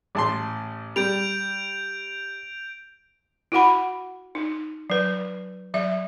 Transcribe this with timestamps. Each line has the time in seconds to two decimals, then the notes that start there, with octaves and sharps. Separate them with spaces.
0.15 A1 A5 C6
0.96 G3 G6 D7 F7
3.52 E4 F#4 F#5 B5
4.35 D#4
4.90 F#3 B4
5.74 F#3 E5